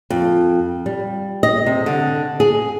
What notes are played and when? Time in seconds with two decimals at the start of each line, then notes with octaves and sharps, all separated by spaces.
0.10 F2
0.86 G3
1.43 D#5
1.66 C3
1.86 D3
2.40 G#4